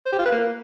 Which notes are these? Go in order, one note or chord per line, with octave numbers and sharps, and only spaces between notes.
C5
G4
F4
B4
A#3